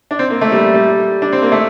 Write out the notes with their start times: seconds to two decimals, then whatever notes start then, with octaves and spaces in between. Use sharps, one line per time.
0.11 D4
0.19 C4
0.30 A#3
0.41 A3
0.52 G3
0.74 G3
1.22 D4
1.33 C4
1.42 A#3
1.52 A3